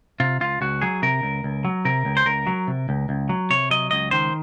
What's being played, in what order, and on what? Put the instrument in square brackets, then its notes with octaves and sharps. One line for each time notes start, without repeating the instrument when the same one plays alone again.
[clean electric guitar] C3 F4
C#2 F4
C#2 F#4
F#3 G#4
C3 A#4
C#2
C#2
F#3
C3 A#4
C#2
C5
C#2 A#4
F#3
C3
C#2
C#2
F#3
C3 C#5
F#3 D#5
C#2 D#5
D#3 C5